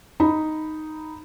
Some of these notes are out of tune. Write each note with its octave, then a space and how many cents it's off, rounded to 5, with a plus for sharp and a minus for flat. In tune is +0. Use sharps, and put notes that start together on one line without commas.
D#4 +0 B5 +0